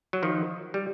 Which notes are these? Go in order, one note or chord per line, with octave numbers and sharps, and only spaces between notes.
F#3
D#3 F3
G3